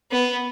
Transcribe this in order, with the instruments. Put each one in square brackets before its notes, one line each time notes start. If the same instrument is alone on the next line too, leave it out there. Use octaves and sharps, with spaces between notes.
[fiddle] B3